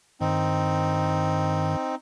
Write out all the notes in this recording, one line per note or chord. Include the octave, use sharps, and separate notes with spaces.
G2 D#3 C4 D#4